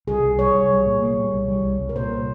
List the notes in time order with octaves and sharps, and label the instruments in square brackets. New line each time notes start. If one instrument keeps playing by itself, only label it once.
[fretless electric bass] C2 [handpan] G#4
[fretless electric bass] C2
[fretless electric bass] G3 [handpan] C#5
[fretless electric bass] C2
G3
A#2
A#3
G3
C2
G3
C2
C2
[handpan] A#4
[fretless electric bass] A#2 [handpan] C5